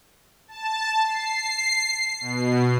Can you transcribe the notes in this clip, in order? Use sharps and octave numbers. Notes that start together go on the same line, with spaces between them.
A5
C7
B2